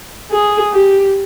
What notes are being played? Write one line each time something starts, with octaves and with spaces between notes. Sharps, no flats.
G#4
G4